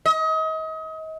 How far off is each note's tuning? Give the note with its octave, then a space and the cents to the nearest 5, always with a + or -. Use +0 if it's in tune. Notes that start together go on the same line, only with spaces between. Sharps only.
D#5 +35